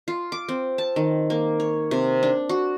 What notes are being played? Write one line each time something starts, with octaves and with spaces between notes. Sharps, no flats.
F4
D6
C4
A5
D#3
A#3
C#5
C3
D4
F#4